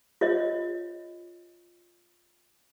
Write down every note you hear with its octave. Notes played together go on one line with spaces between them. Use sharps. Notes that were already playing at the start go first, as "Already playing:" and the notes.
F4 C#5 D#5